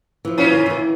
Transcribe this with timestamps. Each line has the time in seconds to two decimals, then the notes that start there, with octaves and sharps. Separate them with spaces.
0.25 E3 F3
0.38 A#2 C#4 F4
0.53 D#3
0.66 D#3 E3